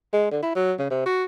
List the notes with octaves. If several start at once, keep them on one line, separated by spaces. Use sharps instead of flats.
G#3
D3
E4
F#3
C#3
C3
F#4